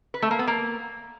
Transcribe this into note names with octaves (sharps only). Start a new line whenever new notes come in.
B4
A3
A#3
B3
A#3